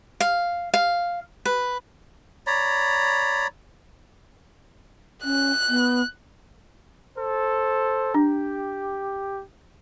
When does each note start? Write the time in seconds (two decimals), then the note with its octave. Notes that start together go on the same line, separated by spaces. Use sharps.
0.20 F5
0.74 F5
1.45 B4
2.47 C#5 D5 A#5 B5
5.24 C#4 F#6
5.69 B3
7.17 A4 C5
8.14 D4 G4